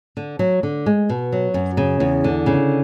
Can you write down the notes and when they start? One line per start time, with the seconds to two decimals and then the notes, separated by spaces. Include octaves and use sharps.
0.17 D3
0.39 F#3
0.63 D3
0.86 G#3
1.09 B2
1.32 F#3
1.54 F#2
1.77 C#3
2.00 E2
2.24 D3
2.46 C#3